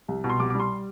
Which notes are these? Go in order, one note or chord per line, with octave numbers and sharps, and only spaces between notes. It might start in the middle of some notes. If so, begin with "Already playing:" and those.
C2
B2
C6
C2 D6
D6
G3 C6